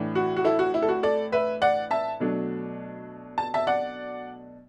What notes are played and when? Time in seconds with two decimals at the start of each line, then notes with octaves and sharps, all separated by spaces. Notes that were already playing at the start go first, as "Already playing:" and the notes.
Already playing: A2 E3 D4
0.15 F#4
0.36 F#4
0.44 E4 A4
0.59 F#4
0.74 E4
0.82 A4
0.89 F#4
1.03 A4 D5
1.32 B4 E5
1.62 D5 F#5
1.91 E5 A5
2.20 B2 F#3 A3 D4
3.38 A5
3.54 E5 A5
3.67 D5 F#5